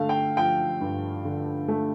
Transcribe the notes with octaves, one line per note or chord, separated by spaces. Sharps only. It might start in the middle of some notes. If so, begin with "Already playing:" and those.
Already playing: D3 A3 F5
G5
F3 G5
G2
D3
A3